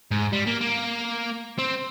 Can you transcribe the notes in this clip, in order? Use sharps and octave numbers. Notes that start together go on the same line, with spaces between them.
G#2
G3
A#3
A#3
C4